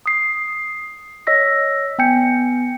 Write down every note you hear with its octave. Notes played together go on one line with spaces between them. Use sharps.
D#6 C7
C#5 D#5 E6 A#6 B6
B3 G5 G#5 G6 C#7